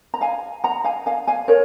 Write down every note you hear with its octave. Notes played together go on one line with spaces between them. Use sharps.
A#5
F5 G#5
F#5 A#5
F5 G#5
F5 G#5
F5 G#5
A#4 C#5